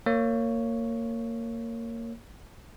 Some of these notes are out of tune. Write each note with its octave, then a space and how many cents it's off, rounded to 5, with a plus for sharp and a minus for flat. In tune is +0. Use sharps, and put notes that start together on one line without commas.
A#3 -20 C#5 +0